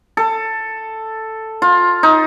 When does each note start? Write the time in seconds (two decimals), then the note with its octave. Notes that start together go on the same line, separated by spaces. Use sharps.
0.17 A4
1.62 F4
2.03 D#4